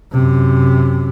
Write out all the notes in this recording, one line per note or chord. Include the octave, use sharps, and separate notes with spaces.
F#2 C3